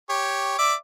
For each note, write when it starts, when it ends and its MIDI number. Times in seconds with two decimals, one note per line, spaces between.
0.10 0.58 67
0.10 0.58 73
0.59 0.74 74
0.59 0.74 76
0.59 0.74 86